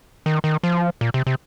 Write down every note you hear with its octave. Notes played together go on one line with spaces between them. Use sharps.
D#3
D#3
F3
A#2
C3
C3